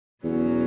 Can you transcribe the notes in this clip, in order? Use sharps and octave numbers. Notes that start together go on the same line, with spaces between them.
E2 B2 F#3 C#4